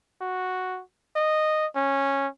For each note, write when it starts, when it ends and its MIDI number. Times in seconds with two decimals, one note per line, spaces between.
0.21 0.81 66
1.16 1.66 75
1.76 2.27 61